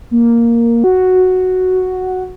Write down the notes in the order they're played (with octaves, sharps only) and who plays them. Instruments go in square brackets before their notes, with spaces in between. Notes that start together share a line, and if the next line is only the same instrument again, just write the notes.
[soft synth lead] A#3
F#4